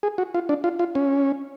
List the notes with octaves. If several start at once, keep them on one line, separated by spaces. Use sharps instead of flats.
G#4
F#4
F4
D4
F4
F4
C#4